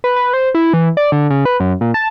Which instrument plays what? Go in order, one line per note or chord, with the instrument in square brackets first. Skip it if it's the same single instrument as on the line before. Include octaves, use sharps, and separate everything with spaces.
[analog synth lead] B4
B4
C5
E4
E3
D5
D3
C#3
B4
F#2
A#2
A5